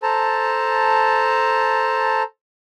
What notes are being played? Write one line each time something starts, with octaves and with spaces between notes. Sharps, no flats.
A4 C5 A5 A#5